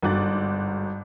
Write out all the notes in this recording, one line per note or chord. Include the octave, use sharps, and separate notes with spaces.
G1 G#2 F#4 D6 F#6 A6